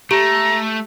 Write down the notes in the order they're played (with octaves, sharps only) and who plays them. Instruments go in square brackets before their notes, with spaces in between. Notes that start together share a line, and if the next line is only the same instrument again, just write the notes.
[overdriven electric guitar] A3 [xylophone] G4 [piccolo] A#5